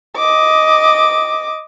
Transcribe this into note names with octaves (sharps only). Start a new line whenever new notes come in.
D#5 D6